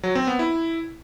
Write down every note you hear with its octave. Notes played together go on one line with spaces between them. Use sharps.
F#3
C4
B3
E4